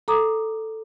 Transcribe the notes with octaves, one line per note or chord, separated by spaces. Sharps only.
A4 A#5 D6 D#6